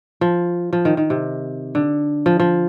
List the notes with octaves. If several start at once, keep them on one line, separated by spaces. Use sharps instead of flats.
F3
F3
D#3
D#3
C3
D3
F3
F3